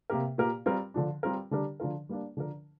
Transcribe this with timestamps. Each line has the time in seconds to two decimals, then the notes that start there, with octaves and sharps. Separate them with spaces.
0.10 C3 A#3 G4 A#4
0.38 A#2 A#3 G4 A#4
0.66 G3 C4 F4 A#4
0.94 D3 F3 D4
1.23 G3 C4 F4 A#4
1.51 D3 G3 D4 G4 A#4
1.80 D3 F3 D4 F4 A#4
2.09 G3 A#3 D4
2.37 D3 F3 D4 A#4